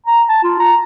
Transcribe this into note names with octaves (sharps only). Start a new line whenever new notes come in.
A#5
A5
F4
A#5